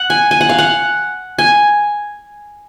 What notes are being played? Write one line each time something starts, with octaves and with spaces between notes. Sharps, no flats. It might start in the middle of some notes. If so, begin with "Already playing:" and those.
Already playing: F#5
G#5
G#5
F#5
F5
F#5
G#5